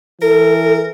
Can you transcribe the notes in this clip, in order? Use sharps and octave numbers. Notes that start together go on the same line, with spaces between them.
E3 A4 A#4